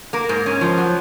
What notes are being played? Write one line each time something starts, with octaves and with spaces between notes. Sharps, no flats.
A#3 A#4
G#2
C#4
F3
F#3